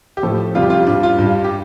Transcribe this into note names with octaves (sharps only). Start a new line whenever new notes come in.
G4
A2 F3 A4
F2 C3 G3 F4
G4
F4
G2 G3 D4
F4
G2 G3
G4